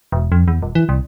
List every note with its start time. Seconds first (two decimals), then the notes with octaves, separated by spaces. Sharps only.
0.12 E1
0.32 F2
0.48 E2
0.62 D#1
0.75 E3
0.89 C2